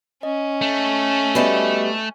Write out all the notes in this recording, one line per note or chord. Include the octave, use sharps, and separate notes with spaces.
C#4 D#5
A3
G3 B3 F#4 D#5 E5